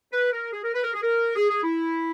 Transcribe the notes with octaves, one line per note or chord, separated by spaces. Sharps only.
B4
A#4
G#4
A#4
B4
A#4
G#4
A#4
G#4
G#4
E4